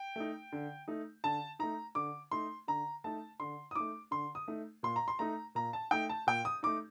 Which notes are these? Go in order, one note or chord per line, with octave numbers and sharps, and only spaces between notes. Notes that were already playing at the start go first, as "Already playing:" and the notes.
Already playing: G5
A3 D#4
D3
A3 D#4
D3 A5
A3 D#4 A#5
D3 D6
A3 D#4 C6
D3 A#5
A3 D#4 A5
D3 C6
D#6
A3 D#4 D6
D3 C6
D#6
A3 D#4
A#2 C6
A#5
C6
A3 D#4 A#5
A#2 A#5
A5
A3 D#4 G5
A5
A#2 G5
D#6
A3 D#4 D6